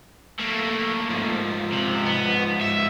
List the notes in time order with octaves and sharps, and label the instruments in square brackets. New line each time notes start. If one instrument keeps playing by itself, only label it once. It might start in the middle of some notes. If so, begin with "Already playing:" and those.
[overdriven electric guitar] A3 A#3
[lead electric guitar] G#2 F3
[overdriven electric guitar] C3
B3
E5